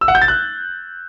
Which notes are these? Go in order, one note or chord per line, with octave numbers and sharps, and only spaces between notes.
E6
F#5
G6
A6
F#6